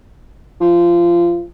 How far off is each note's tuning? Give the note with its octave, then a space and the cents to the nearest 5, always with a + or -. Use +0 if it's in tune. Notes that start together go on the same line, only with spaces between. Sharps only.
F3 -20